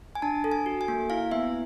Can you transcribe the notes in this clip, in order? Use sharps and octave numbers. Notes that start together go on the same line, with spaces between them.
G#5
D4 A5
A4
G#5
F#4
G#5
A#3
E4 F5
B3 E5